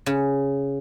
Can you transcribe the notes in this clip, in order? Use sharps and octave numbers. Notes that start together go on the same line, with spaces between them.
C#3